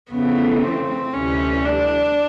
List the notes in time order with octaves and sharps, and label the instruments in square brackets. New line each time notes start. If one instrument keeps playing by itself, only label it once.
[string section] F2 C#3 E3 A3 [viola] B3
[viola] C4
[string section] D2 C3 E3 G3 [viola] C#4
[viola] D4